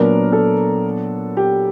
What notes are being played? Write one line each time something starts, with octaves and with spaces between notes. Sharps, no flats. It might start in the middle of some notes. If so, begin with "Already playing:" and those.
Already playing: A#2 F#3 B3 D4 A#4
A4
G4